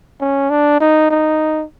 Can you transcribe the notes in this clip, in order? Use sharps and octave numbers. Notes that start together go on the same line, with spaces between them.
C#4
D4
D#4
D#4